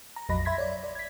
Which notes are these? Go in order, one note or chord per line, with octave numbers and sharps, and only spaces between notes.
A#5
A#1 F2 F#3 D#5 B5 A#6
E5 B5 C6 G#6 A#6 B6
C#5 D5
D5
G#6 B6